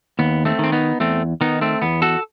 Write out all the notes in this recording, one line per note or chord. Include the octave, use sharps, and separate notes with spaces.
D#2 B3
A3 C4
D#3 C4
B3 D#4
E2 A3 C4
D#3 B3 D#4
A3 C4
E2 B3
F#4 A4